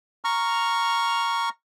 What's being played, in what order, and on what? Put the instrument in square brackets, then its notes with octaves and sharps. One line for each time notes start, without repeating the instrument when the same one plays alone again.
[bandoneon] A#5 C#6 F6